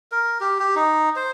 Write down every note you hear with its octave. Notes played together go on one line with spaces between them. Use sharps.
A#4
G4
G4
D#4
C5